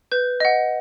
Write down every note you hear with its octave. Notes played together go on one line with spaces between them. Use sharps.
B4 G6
D#5 F#5